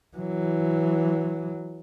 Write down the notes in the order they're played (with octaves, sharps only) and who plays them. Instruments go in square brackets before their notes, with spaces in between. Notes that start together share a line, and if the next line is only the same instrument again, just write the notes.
[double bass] E3 F#3